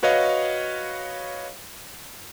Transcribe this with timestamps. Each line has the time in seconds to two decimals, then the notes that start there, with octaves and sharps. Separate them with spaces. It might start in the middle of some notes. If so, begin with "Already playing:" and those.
0.03 F#4 B4 C#5 D#5 F5